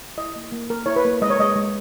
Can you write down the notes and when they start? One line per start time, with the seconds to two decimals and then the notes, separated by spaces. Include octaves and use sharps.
0.18 E4 D#5
0.36 A#3
0.52 A#3
0.70 A#3 A#4
0.86 E4 C#5
0.96 B4
1.05 A#3
1.22 G#3 D#5
1.30 C#5
1.39 G#3 D#5
1.56 G#3